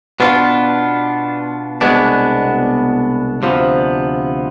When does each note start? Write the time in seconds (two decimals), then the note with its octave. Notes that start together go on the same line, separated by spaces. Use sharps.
0.20 B2 B3 D4 F4
1.81 C2 B2 G#3 B3 D4
3.42 D2 C3 F3 B3